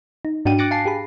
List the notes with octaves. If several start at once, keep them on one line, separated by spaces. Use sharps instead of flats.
D#4
G#2 D4 F#4 G5 D#7
D6 F#6 A6 A#6 C#7 D7
F5 G#5 A5 C7
G4 G#4 B5